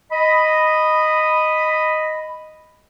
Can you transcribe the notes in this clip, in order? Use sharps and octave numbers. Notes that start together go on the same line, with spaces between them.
D#5 B5